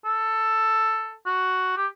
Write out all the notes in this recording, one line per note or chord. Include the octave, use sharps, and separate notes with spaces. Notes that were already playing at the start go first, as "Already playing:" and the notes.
A4
F#4
G4